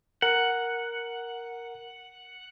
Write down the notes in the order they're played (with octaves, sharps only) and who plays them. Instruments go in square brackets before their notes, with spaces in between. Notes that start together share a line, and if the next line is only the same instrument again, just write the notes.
[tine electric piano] A#4 [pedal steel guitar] F#5